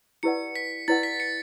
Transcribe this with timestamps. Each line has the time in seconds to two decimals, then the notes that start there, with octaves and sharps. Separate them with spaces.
0.23 E4 G4 B4 D5 F#5 C#7
0.56 B6
0.88 E4 G4 B4 D5 F#5 A6
1.03 B6
1.20 C#7